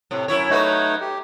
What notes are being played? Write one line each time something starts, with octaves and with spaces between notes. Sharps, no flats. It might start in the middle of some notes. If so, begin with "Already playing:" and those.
A2 C3
F#2 E4 C#5
F#3 A3 D#4 F#4 B4 C#5
G4